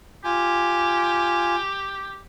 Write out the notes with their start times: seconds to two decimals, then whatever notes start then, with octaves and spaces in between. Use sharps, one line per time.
0.24 F4 G4 G#5